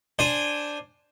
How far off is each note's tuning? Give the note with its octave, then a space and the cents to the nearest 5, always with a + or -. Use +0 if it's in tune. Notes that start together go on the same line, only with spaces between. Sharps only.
D4 +0 C5 +0 G#5 -15